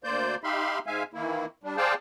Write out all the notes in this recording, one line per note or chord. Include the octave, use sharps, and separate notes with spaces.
D2 A#3 C5 D5 G6
D#4 G4 E5 F5 B5 C6
G#2 G#3 E5 F5 G#5
D#3 E3 A#3 E4
G3 D4
G#4 C5 D5 F5 G5 A5